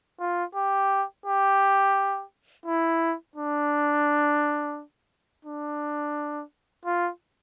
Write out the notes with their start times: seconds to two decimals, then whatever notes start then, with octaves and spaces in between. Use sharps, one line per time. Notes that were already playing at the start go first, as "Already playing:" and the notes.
0.20 F4
0.55 G4
1.26 G4
2.66 E4
3.36 D4
5.45 D4
6.86 F4